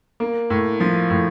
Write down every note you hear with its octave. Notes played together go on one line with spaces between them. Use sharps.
A#3
A2
F3
A2